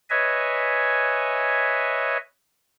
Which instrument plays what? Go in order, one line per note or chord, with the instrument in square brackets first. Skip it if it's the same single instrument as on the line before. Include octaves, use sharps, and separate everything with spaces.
[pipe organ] B4 C#5 D#5 E5 G#5